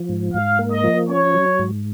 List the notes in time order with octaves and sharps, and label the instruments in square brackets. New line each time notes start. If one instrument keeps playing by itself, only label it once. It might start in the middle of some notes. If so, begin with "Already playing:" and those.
Already playing: [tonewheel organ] F3
G#2
[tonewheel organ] G#2 [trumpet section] F5
[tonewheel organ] A#3
[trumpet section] D#5
[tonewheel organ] F3
[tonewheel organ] C#4 [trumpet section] C#5
[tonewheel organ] F#3
G#2